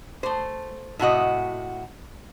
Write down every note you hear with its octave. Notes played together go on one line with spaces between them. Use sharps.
A3 C5
A2 C3 F#4 D#5